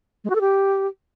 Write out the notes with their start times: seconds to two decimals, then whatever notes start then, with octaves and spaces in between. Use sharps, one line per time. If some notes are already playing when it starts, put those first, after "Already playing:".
0.24 G#3
0.30 F#4
0.35 A4
0.41 G4